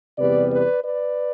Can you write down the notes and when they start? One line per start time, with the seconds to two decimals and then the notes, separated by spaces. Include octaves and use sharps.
0.18 E2 C3 G3 B3 B4 D5
0.52 B4 D5
0.84 B4 D5